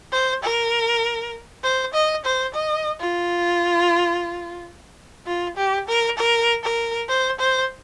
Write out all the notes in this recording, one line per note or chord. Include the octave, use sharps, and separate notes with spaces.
C5
A#4
C5
D#5
C5
D#5
F4
F4
G4
A#4
A#4
A#4
C5
C5